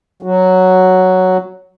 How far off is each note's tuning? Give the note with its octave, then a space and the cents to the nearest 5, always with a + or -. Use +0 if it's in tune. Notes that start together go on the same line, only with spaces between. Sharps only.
F#3 +0 F#4 +0